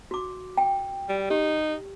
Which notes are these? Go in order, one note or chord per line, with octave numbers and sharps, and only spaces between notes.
F#4 D6
G5
G3
D#4 G4